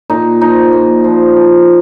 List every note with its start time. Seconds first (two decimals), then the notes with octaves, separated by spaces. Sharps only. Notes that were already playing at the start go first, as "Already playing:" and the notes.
0.10 A#2 D#4
0.41 F3 D#4
0.73 A#2
1.04 F3
1.36 F3